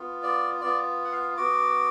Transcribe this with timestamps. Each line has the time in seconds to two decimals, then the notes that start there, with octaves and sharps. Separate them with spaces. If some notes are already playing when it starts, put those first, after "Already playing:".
Already playing: B3 F4
0.23 D5
0.61 B3 F4 D5
1.05 F#5
1.12 F5
1.37 B3 F#4 D6